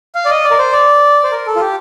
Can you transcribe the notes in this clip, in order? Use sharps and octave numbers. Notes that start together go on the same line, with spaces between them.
F5
D5
D#5
D5
A#4
C5
D5
C5
A#4
A4
F4
G4